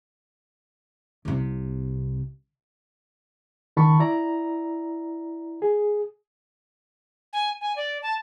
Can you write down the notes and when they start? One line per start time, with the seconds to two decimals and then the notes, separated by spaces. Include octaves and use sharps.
1.25 C2 C3
3.77 C#2 D#3 A5 B5 C#6
4.00 E4 D5 A#5
5.62 G#4
7.33 G#5
7.61 G#5
7.76 D5
8.02 A5